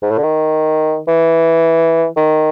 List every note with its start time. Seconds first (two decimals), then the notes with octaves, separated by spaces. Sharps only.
0.02 G#2
0.11 A2
0.18 D3
0.23 D#3
1.08 E3
2.17 D#3